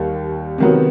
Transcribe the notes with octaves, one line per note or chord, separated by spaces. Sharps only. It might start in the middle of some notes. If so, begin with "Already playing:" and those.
Already playing: D#2 D#3 G3
C3 D#3 F#3 B3